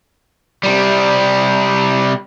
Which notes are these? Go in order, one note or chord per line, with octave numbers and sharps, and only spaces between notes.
C3 G3